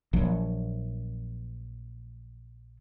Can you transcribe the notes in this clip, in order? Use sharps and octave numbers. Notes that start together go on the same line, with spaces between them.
A#1 F3 F#3